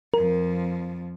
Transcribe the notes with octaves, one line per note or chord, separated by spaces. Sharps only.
F2 F3 A#4